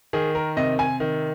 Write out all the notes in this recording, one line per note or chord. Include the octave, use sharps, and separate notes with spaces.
D#3 G#4
A#4
C3 D#5
G#5
D#3